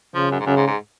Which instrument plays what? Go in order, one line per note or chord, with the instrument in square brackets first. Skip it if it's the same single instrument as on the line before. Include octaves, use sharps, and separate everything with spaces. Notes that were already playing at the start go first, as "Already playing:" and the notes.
[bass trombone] C#3 [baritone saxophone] F3
[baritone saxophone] F#2
G#2
[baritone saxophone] F#2 [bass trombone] C#3
[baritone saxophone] G#2
G#2